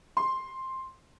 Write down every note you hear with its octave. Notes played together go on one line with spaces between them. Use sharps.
C6